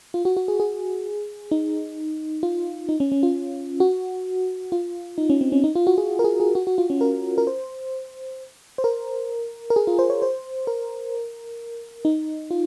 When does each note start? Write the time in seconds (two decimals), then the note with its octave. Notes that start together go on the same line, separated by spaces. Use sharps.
0.14 F4
0.25 F#4
0.37 F#4
0.48 G#4
0.60 G#4
1.51 D#4
2.43 F4
2.89 D#4
3.00 C#4
3.12 C#4
3.23 F4
3.80 F#4
4.72 F4
5.18 D#4
5.30 C#4
5.41 C4
5.52 C#4
5.64 D#4
5.75 F4
5.87 F#4
5.98 G#4
6.19 A#4
6.24 G#4
6.40 G#4
6.55 F#4
6.67 F#4
6.78 F4
6.90 C#4
7.01 A#4
7.38 A#4
7.47 C5
8.78 C5
8.84 A#4
9.70 A#4
9.76 G#4
9.87 F4
9.99 C5
10.10 C#5
10.22 C5
10.67 A#4
12.05 D#4
12.51 F4